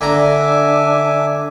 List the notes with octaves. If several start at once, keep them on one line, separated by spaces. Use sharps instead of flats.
D3 D4 E5 G#5 A#5 D6